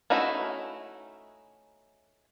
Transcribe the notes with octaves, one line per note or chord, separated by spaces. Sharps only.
A3 C#4 D#4 E4 F#4